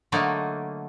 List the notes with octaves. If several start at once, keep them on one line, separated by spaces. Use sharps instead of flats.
D3 F#3 A3 A#3 D#4